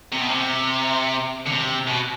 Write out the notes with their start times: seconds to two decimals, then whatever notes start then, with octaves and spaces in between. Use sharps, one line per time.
0.13 C3
0.21 B2
0.29 C3
1.46 D3
1.52 C3
1.87 B2